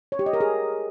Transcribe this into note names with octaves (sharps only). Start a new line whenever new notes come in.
C#5
G4
D#5
A#4
G#4